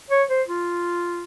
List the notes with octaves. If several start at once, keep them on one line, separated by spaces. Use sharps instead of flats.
C#5
C5
F4